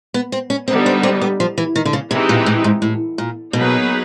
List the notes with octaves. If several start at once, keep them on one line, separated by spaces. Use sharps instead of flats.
B3
C4
C#4
D3 G3 B3 C4 D#4
C4
C4
B3
F3
E3
D#3
D3
C#3
C3 E3 G#3 C4 D#4 G4
A#2
A2
G#2
A2
A#2
B2 F#3 A#3 D#4 G#4 B4